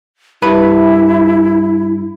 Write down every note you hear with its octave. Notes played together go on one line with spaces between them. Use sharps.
G2 E4 B4 B5